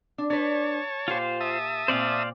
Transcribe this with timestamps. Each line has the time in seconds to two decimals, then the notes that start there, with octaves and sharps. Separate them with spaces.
0.18 D4
0.30 D4 B4 C#5 A5
1.08 A#2 F4 G4 C5 F5
1.40 E5 A5 D#6
1.88 A#2 C4 C5 D5 F5